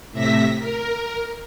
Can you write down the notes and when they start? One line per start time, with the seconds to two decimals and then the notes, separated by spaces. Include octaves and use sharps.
0.12 A2 C3 E5 A#6 B6
0.59 A#4